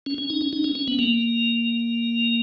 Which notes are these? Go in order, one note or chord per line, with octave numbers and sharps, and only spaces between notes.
C#4
C#4
D#4
C#4
D#4
C#4
C#4
B3
A#3